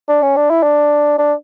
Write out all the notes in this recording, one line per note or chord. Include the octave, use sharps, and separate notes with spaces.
D4
C#4
D4
E4
D4
D4